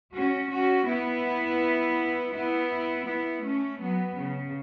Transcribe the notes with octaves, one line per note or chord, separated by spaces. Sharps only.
C#4 F#4
C#4 F#4
B3 E4
B3 E4
B3 E4
A3 C#4
F#3 B3
C#3